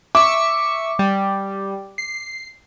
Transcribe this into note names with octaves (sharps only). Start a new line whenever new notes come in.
E5 C#6 D6
G3
C7